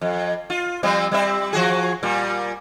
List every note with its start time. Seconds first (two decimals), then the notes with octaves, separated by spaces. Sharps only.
0.01 F2
0.50 F4
0.83 F3 G3 C4
1.11 G3 C4 E5
1.53 F3 F#4 G#4
2.03 A#2 G3